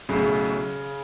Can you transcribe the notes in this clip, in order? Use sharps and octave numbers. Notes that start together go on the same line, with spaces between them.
B1 A2 C#3 F#3